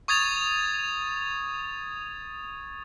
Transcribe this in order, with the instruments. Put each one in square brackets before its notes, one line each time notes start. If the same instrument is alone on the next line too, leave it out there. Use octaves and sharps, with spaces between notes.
[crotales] C#6 D#6 G#6 A6 F7